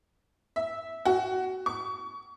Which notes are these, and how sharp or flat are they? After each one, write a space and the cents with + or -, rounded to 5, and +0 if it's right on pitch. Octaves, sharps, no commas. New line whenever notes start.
E5 -10
F#4 +15
C#6 +25